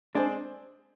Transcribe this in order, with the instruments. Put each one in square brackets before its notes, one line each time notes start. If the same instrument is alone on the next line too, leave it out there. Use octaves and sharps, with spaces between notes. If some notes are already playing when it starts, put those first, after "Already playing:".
[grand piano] G#3 C4 G#4 C5 [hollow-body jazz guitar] D4